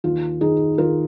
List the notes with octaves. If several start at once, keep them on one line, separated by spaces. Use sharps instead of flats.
D#2 F4
D#3 D#4 G#4
D#3 F4 A#4